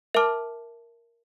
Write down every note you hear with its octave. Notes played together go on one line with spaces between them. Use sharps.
A#4 E5 A5 D6 F6